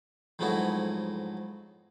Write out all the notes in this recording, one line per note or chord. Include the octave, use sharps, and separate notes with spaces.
F2 G#2 F#3 A3 B3 E4